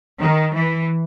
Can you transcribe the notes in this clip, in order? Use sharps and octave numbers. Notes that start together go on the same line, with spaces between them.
D#3
E3